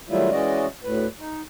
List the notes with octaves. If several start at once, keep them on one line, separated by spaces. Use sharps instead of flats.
D#3 F#3 G3 A3 E4 F4
E3 G#3 C#4 F#4 D5 D#5
D2 A2 B4
D#4